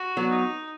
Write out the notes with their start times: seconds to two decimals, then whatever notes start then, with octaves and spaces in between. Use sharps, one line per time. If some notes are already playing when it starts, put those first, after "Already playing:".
Already playing: F#4
0.17 F#3 B3
0.29 D#4